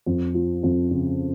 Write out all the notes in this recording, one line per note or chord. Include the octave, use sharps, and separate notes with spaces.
F2
F3
F2
C#3